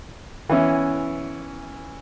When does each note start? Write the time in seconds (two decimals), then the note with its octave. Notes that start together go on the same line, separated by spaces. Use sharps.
0.49 E3 B3 C#4 E4